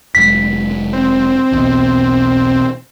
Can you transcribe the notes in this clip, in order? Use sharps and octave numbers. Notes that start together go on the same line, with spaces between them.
F1 F#2 G#3 B6
C4
B1 E2 B2